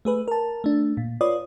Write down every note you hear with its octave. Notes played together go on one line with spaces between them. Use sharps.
A3 G#4 B4
A#4 A5
A3 D4
A#2
F4 B4 C#5 D5 D#6